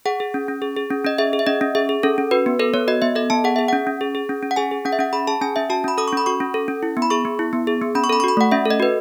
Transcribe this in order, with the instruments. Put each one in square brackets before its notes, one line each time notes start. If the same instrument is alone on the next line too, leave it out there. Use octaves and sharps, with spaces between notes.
[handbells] G#4 F#5
G#4
C#4
C#4
G#4
G#4
C#4
C#4 D#5
G#4 E5
G#4
E5
C#4 D#5
C#4
G#4 E5
G#4
C#4 A4
C#4
F#4 B4
B3
A4 B4
B3 C#5
F#4 D#5
B3 E5
A4 D#5
B3 A5
G#4 F#5
G#4 E5
C#4 F#5
C#4
G#4
G#4
C#4
C#4
F#5
G#4 G#5
G#4
C#4 F#5
E5
C#4 F#5
G#4 B5
G#4 A5
C#4 G#5
C#4 E5
F#4 A5
C#4 B5
A4 D#6
C#6
C#4 B5
F#4 C#6
C#4
A4
C#4
E4
B3
B5
G#4 C#6
B3
E4
B3
G#4
B3
C#4 B5
C#6
A4 B5
C#6
F#4 B5
A3 F#5
C#4 E5
A4
D#5
F#4 B4